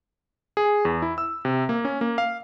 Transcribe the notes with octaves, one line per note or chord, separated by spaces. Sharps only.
G#4
E2
E4
E6
C3
A#3
C#4
A#3
F5